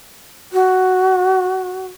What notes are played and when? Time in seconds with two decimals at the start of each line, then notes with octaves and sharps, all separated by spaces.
0.53 F#4